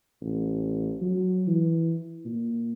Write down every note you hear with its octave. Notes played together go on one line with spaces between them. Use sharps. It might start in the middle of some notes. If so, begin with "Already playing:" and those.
A1
F#3
E3
A#2